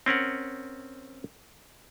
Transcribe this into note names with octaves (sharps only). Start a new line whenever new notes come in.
C4 C#4 A#4 F#5